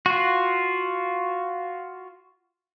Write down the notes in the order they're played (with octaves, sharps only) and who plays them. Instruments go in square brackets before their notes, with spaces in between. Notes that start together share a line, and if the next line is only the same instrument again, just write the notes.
[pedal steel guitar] F4 F#4